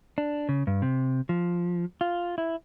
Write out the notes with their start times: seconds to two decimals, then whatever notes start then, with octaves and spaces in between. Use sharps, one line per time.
0.18 D4
0.49 C#3
0.67 G2
0.82 C3
1.29 F3
2.01 F4
2.38 E4